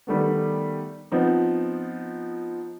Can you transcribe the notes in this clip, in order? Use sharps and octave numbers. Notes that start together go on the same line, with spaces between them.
D#3 G3 A3 B3
F3 B3 C4 D#4